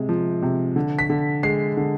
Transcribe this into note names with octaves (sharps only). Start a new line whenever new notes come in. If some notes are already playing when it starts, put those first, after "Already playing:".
Already playing: C3 G#3
F3
C3
D3
B6
D3
G#3 C7
D3